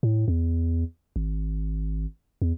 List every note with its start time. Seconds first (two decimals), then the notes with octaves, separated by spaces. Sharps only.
0.03 A2
0.28 E2
1.16 G#1
2.42 E2